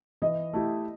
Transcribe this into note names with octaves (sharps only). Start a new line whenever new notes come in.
E3 D#5
A3 E4 G4